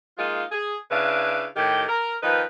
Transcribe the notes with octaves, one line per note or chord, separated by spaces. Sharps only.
G#3 A#3 D#4 F4
G#4
C#3 D4 E4 B4 F5
A2 D#3 G4
A#4
D#3 F3 D#4 B4